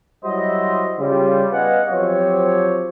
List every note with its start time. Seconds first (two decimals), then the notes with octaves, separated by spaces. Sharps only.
0.25 F#3 G3 E4 F#4 C5 D#5
0.99 C#3 G3 F4
1.52 B3 B4 D#5 F5 F#5 G#5
1.89 F3 F#3 C4 G4 C#5